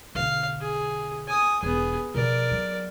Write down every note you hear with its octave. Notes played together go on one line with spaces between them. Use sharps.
B1 D3 F5
G#4
G#5 D#6
E1 B3 G#4
B2 F3 A#4 D5
F#3